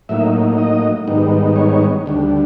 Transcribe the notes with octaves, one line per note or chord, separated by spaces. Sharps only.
A2 F#3 A#3 D#4 E5
D#5
G#2 D#3 G3 B3 D#4
C#5
D2 D3 G3